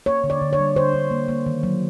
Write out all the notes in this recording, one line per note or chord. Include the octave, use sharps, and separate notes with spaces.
A#3 C#5
D3
D5
D3
C#5
G3
D3 C5
D3
A#3
A#3
D#3
F#3